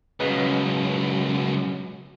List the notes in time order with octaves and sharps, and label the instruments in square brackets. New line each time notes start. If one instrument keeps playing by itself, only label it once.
[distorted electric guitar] C#2 B2 [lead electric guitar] F#2 [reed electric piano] G#4 B4 D#5